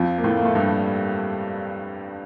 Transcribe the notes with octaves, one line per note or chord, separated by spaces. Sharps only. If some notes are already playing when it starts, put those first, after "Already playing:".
Already playing: F2 F3
A#3
A2 A3
A#3
A3
G2 G3